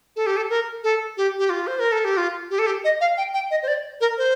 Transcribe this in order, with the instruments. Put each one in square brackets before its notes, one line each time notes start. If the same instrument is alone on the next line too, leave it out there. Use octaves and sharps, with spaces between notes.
[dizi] A4
G4
A4
A#4
A4
G4
G4
F4
C5
A#4
A4
G4
F4
G4
A4
G4
D#5
F5
G5
G5
D#5
C5
D5
A#4
C5